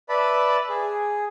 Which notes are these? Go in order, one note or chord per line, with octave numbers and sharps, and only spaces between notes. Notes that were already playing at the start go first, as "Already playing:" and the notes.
B4 D5 E5 A5 B5
G#4